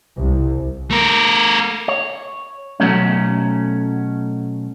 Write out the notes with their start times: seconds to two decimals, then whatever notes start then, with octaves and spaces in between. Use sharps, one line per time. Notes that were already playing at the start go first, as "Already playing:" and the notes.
0.15 C2
0.91 A3 A#4
1.88 C#5
2.80 B2 F#3 A3 C#4